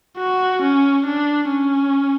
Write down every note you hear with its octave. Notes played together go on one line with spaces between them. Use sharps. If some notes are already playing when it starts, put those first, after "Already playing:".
F#4
C#4
D4
C#4